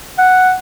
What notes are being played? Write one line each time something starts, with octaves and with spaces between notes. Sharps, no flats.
F#5